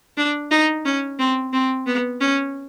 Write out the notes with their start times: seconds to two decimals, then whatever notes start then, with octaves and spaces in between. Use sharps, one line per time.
0.17 D4
0.51 D#4
0.85 C#4
1.19 C4
1.53 C4
1.87 B3
2.21 C#4